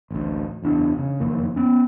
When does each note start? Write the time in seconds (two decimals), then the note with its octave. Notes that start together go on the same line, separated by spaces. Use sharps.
0.11 A1 D2
0.62 F#1 E2 D4
0.98 C#3
1.20 F#1 F2 D#3 A#3
1.56 B3 C#4